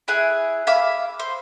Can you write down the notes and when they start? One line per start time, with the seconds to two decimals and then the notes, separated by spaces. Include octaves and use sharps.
0.08 E4 G#4 G#5 F#6
0.67 E5 F5 B5 D6
1.19 C5